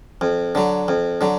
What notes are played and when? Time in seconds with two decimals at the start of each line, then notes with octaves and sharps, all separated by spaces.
0.21 F2
0.55 D3 F#3
0.88 F2
1.21 D3 F#3